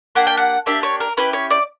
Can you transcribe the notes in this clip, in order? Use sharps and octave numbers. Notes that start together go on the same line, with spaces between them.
A#3 D4 G4 F#5
G5
F#5
A#3 D4 G4 E5
C#5
A#4
C#4 E4 G4 B4
C#5
D5